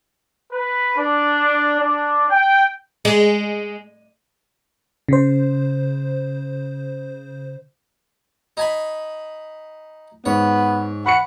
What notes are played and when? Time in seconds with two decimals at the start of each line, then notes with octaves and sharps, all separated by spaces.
0.51 B4
0.97 D4
1.81 D4
2.30 G5
3.05 G#3
5.09 C#3 C5
8.57 D#4 G#5 B5
10.26 G#2 B3 C#5
11.06 F#5 B5 C#6 C#7